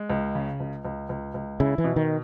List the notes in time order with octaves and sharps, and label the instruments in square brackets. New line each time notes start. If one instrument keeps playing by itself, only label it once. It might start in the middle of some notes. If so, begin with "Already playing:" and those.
Already playing: [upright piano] G#3
C#2
C#3
C#2
C#2
C#2
C#2
[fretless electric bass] C#3 [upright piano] E4
[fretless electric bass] E3
[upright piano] B2
[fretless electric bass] D#3